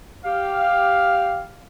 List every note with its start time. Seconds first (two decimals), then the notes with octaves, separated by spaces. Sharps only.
0.25 G4 F5